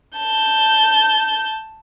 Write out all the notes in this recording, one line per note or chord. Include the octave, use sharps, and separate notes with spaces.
A5 G6